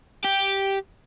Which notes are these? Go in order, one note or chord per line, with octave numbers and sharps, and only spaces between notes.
G4